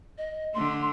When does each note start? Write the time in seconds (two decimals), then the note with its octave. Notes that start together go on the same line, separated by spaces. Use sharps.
0.18 D#5
0.54 D3 A3 C6